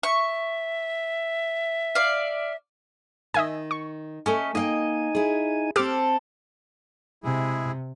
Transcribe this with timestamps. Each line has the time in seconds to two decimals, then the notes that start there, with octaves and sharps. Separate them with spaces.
0.03 E5 C#6
1.95 D5 F5
3.34 D#3 D#5 E5 G#5
3.71 C#6
4.26 A3 C#4 A4 D#5 G#5
4.55 A#3 D#4 D#5 F5 G5 G#5
5.15 E4 G#4
5.76 C4 G4 A4 C5 D6 F6
7.24 C3 G#3 E4 G#4